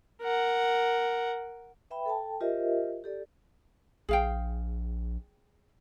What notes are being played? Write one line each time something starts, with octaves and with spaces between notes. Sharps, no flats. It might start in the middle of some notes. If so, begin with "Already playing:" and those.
A#4 F#5
B4 E5 G5 B5
A4 G5 A5
F4 G4 A#4 C5 D#5 E5
G4 A4 D5
A#1 G#4 F5 G5